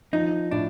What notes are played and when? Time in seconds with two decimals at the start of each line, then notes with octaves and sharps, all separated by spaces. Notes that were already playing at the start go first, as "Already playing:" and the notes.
0.13 F3 D#4
0.51 A2 D4